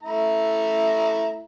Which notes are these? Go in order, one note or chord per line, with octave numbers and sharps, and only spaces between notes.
A3 E4 A#5